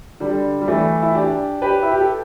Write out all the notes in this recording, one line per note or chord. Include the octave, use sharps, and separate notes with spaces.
D3 G3
G3
E3 A3
E4
D4 G4
G4 B4
E4
G4
A4